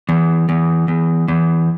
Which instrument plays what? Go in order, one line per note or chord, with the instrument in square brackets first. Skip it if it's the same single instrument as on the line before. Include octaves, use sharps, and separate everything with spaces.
[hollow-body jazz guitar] E2
E2
E2
E2